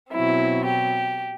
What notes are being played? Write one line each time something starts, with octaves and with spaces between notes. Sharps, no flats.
B2 F#3 C4 E4
G4